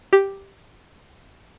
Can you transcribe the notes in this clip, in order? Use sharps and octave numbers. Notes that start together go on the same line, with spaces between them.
G4